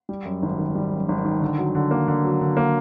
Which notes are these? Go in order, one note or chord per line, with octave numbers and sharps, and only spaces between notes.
G3
F#2
G#1
D#3
G3
F#2
G#1
D#3
D3
F#3
D3
A#3
D3
F#3
D3
A#3